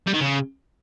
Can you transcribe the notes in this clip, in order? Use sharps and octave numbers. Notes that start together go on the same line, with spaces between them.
G3
D#3
C#3